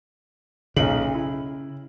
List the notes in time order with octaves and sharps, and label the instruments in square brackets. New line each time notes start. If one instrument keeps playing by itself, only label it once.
[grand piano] B1 A#2 F#7 [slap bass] C#3
[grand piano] E4